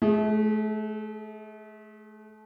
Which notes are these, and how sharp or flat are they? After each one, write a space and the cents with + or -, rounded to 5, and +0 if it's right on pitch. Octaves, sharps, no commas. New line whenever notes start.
A3 -35 G#4 +0